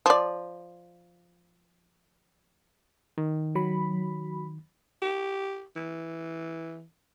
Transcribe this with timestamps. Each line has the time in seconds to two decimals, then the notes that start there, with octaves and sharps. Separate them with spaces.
0.06 F3 D5
3.18 D#3
3.55 F#3 B5
5.02 G4
5.76 E3